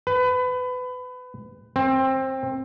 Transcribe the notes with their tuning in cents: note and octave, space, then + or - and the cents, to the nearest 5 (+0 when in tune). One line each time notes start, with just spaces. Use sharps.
B4 +25
C4 +20